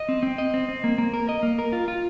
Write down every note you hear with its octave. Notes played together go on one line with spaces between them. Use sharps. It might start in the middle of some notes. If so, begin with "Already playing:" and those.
Already playing: D#5
C4
C4
D#5
C4
C4
A#3
A#3
A#4
D#5
A#3
A#4
F4
F4